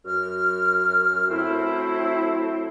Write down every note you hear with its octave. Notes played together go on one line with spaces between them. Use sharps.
F#2 F6
F#3 A3 C4 E4